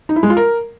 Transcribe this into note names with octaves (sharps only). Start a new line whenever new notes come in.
D#4
E4
G#3
F4
A#4